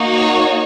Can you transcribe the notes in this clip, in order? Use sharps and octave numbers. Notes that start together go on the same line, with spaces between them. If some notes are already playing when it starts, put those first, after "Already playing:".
Already playing: A#3 D#4 F#4
C#5